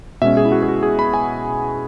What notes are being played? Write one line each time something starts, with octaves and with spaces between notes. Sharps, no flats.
B2 G#3 C#4 E5
G#4
E4
F#4
G#4
F#4
G#4
B5
G#5